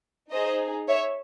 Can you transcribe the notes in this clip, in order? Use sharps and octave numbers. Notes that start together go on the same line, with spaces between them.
D#4 G#4 C5 D#5
C#5 E5